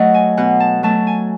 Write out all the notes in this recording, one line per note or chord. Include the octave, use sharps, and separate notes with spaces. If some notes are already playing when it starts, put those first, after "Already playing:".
Already playing: F#3 A3 C#5 D#5 F#5
G#5
B2 F#5
A5
F#3 A3 A5
G#5